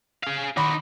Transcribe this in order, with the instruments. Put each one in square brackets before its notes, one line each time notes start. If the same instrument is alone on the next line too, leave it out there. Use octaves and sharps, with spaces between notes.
[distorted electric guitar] G#4 F5
[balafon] D#3 B5 C6 [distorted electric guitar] D#4 F#4